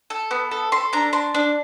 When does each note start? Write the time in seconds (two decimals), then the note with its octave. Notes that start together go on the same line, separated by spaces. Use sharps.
0.10 A4
0.31 B3
0.51 A4
0.72 A4 C6
0.93 D4 A#5
1.13 D4 C6
1.35 D4